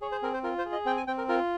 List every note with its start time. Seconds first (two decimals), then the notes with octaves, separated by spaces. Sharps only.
0.01 G#4 C#5
0.12 C5
0.22 C4 A#4
0.34 C5
0.43 F4 A#4
0.58 C5
0.66 G#4
0.72 D#5
0.86 C4 G5
0.97 G#5
1.07 C4 G5
1.18 A#4
1.29 F4 A#4